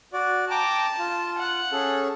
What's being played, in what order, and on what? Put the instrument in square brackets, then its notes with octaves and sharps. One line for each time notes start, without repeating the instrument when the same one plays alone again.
[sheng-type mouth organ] F#4 D5
[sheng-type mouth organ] G5 A#5 D6 [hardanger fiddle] A5
[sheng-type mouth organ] F4
[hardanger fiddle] F#5
[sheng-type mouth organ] C#4 G#4 A4